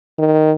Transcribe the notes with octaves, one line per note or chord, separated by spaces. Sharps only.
D#3